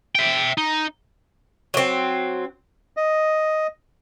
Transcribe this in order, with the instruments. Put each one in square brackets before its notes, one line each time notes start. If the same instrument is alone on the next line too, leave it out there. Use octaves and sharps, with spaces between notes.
[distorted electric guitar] E5 G5
D#4
[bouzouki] F#3 C4
[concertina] D#5